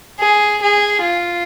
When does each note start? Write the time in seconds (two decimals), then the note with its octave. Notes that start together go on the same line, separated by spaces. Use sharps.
0.19 G#4
0.61 G#4
1.03 F4